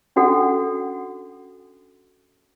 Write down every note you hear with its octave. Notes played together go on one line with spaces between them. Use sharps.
C#4 D4 F#4 A4 F#5